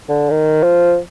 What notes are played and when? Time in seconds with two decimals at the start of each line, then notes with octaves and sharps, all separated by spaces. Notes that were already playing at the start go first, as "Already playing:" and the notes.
0.09 D3
0.30 D#3
0.63 F3